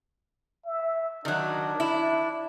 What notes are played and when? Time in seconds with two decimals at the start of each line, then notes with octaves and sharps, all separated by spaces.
0.66 E5
1.25 D#3 F#3 D4
1.80 E4